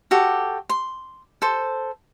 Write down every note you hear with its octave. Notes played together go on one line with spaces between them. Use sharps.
F#4 G4 A4
C6
A4 C5